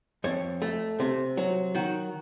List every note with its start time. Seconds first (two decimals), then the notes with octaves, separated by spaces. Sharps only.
0.24 F2 C#5
0.62 A3
1.00 C3
1.37 F#3
1.75 D#3 F#4